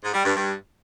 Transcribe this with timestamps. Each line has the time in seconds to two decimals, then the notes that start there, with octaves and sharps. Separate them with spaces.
0.03 G#2
0.13 G3
0.24 G2
0.35 G2